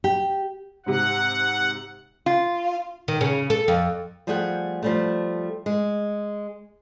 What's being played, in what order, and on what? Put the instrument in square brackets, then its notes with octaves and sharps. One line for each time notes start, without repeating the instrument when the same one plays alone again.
[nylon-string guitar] G4
[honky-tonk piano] G#2 C3 [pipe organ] F#5
[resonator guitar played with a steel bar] F4
[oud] D#3
C#3
A4
F2
[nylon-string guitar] F3 G3 A3 G#4 F#5 G5
F3 G3 A3
G#3